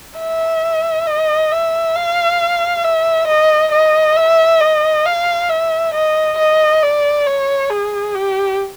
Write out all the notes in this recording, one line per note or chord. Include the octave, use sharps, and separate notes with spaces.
E5
D#5
E5
F5
E5
D#5
D#5
E5
D#5
F5
E5
D#5
D#5
D5
C#5
G#4
G4